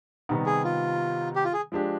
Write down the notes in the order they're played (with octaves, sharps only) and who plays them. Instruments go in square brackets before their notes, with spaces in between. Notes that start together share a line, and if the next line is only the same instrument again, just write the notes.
[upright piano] C3 D#3 G3 B3 D#4
[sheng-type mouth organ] G#4
F4
G4
F4
G#4
[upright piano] F3 G#3 D4 G4